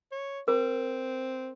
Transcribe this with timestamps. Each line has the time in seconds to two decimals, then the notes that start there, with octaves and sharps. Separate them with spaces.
0.12 C#5
0.48 C4 A#4